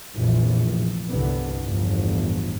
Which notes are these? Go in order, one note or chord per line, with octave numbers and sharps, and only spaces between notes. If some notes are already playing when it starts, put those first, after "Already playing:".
F1 A#1 E3
G1 C2 D3 B3
G1 E2 A2 F3